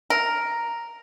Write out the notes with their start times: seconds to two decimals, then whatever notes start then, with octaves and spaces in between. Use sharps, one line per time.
0.10 A#4